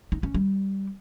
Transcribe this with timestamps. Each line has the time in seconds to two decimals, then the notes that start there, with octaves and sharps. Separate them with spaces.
0.12 D#4
0.23 C#4
0.34 G3